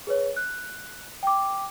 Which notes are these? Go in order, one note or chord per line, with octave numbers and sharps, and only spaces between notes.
G#4 B4 C#5
F#6
G5 D6